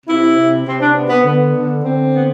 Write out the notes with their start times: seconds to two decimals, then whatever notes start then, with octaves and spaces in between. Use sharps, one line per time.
0.06 C3 E4
0.36 C3
0.65 C3 C4
0.80 D4
0.95 B3
1.09 B3
1.24 D3 B3
1.54 D3
1.83 D3 C4
2.12 B3